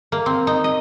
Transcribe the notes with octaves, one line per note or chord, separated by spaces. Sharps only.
A#3
C4
D#4
D#5